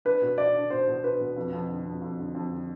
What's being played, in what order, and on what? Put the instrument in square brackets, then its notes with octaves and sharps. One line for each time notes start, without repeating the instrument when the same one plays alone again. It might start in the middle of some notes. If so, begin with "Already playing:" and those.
[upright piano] D4 [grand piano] B4
[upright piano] B2
[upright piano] D4 [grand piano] D5
[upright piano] D4
[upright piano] B2 [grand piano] C5
[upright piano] B2
[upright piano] D4 [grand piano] B4
[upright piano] B2
F2
F2
D3
F2
F2
D3
F2
D3